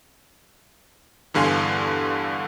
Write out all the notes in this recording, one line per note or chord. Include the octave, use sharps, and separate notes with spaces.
E2 G2 D3 F5 G#5 C6